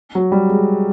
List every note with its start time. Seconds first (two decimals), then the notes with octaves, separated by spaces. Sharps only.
0.15 F#3
0.32 G3
0.49 G#3